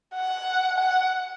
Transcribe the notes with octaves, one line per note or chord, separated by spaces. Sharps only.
F#5
F#5